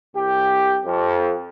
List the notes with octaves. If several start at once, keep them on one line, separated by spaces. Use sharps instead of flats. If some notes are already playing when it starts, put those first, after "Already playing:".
C2 G4
F2